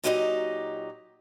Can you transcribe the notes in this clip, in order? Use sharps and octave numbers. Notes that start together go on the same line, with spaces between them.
A#2 F#3 D#4 G4 B4 D#5